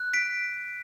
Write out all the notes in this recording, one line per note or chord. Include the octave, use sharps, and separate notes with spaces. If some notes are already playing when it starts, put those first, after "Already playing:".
Already playing: F#6
B6 D7